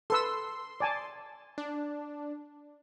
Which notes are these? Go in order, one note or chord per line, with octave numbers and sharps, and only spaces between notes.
A4 B4 C6 E6
D5 G#5 A5
D4